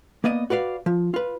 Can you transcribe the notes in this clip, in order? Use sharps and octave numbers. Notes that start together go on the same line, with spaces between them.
A#3 B3 D5 D#5
F#4 B4 D5 F5
F3
F4 B4